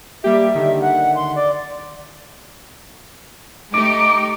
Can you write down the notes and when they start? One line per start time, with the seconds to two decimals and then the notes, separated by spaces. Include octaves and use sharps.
0.24 G3 A#3 G4 E5
0.55 D3 D#3
0.81 F#5
1.16 C6
1.35 D5
3.74 A3 D#4 G4 D6